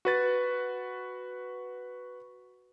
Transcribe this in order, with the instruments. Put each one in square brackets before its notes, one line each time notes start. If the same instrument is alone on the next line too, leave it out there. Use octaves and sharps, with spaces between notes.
[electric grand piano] F#4 B4 A6